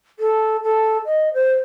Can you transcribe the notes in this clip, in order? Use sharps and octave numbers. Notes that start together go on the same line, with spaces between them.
A4
A4
D#5
C5